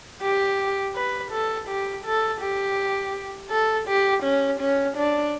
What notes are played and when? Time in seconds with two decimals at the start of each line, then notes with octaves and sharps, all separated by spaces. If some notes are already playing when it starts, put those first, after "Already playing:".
0.22 G4
0.96 B4
1.32 A4
1.69 G4
2.05 A4
2.41 G4
3.51 A4
3.88 G4
4.24 C#4
4.61 C#4
4.97 D4